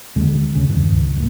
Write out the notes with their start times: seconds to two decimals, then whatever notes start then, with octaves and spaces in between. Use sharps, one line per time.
0.16 D#2 D3 G#3
0.52 D2 C#3
0.69 E2 G2 D#3
0.91 C#2
1.16 D1 A1 G#2 A#3